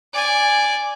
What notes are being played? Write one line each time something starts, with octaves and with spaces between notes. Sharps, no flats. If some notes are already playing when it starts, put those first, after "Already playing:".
D5 G#5